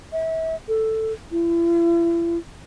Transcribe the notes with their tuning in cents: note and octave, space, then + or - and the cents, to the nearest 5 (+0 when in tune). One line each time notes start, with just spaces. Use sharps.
E5 -35
A4 +5
E4 +40